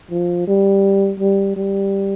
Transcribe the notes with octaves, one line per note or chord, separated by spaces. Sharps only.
F3
G3
G3
G3